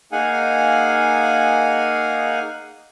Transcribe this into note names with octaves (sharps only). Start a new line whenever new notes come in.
A#3 D#4 G#4 F5 F#5 G#5